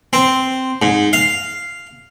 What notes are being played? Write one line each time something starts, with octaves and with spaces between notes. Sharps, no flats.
C4
G#2
F5